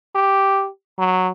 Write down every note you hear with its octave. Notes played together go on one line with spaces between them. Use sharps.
G4
F#3